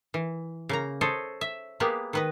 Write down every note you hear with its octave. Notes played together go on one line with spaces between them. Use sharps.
E3
C#3 A#3 A#5
A4 C5 C#5 D#5
E5
G#3 A#3 B3 G4 G#4
D#3 B4 D#5